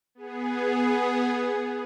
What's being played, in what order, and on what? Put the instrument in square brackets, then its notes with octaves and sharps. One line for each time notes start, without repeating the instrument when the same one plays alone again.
[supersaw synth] B3 G#4